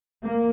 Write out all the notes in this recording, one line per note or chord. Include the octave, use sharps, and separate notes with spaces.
A#3